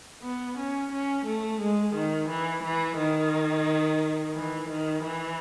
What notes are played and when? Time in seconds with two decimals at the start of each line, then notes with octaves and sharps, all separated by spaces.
0.23 B3
0.57 C#4
0.92 C#4
1.25 A3
1.61 G#3
1.95 D#3
2.29 E3
2.63 E3
2.97 D#3
4.35 E3
4.69 D#3
5.03 E3